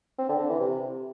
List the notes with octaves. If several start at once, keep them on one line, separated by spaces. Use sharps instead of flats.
C4
D3
D3
E3
C3